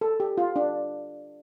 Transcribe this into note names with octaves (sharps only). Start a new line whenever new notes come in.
A4
G4
F4
D4